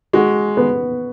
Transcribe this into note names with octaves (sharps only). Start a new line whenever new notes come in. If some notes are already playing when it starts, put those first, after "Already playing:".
G#3 F#4
B3